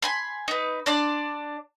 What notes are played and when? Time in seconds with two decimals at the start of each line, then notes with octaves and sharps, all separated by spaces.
0.02 G#5 B5 C6
0.48 D#4 B4
0.86 D4 D5 C6